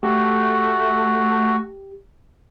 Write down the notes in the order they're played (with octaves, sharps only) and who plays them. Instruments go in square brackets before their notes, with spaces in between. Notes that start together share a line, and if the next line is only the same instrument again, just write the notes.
[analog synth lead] A3 [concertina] F#4 [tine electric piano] G4